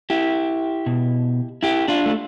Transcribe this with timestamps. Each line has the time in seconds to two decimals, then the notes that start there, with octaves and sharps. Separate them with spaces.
0.10 E4 G4
0.86 B2
1.63 E4 G4
1.88 D4 F4
2.06 A3